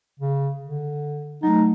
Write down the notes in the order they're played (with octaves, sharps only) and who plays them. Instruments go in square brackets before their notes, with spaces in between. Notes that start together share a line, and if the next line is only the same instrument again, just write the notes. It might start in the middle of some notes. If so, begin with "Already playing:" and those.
[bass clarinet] C#3
D3
[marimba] F#3 A3 [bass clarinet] D#4